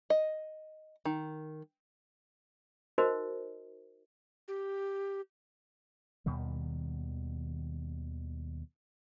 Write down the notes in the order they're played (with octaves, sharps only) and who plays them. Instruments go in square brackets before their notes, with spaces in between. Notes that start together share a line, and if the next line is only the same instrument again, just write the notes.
[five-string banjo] D#5
D#3
[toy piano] D#4 F#4 A#4 C5 D#5
[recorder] G4
[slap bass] D#2 B2 D#3 G3